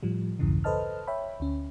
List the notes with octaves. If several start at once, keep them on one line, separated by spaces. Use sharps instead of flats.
A2 F3 G3
B1 E2 G2 C#3 E3
A4 B4 C5 D#5 A5 F6
C#5 E5 G5 B5
D2 C#4